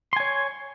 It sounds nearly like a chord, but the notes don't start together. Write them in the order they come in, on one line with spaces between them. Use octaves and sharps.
C6 G#5 C#5